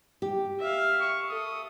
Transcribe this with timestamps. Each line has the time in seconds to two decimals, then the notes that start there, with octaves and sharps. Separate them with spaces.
0.22 G4
0.59 E5 F5
1.00 C#6
1.29 A4 D#6